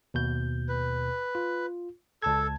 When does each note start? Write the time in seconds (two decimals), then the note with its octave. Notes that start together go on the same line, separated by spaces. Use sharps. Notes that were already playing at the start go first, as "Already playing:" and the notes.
0.14 D#2 B2 G6
0.69 B4
1.35 F4
2.22 C#2 A4 A5 G#6